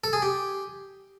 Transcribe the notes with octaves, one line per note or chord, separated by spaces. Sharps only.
A4
G#4
G4